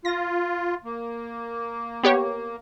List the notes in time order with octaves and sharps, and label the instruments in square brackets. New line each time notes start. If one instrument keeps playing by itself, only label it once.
[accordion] F4 [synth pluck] A#6
[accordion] A#3
[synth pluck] B3 G4 C#5